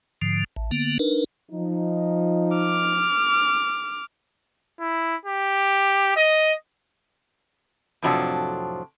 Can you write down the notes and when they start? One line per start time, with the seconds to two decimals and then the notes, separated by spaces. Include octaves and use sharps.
0.22 G#2 D3 F3
0.56 A1
0.71 D3 A#3 B3
0.99 D4 D#4 A#4 B4
1.51 F3 D#4
2.57 D6 F6
4.80 E4
5.25 G4
6.16 D#5
8.02 F2 A2 C3 F3 F#3 D4